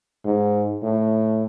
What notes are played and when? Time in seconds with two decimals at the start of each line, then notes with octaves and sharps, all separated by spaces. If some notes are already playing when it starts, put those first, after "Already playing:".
0.25 G#2
0.83 A2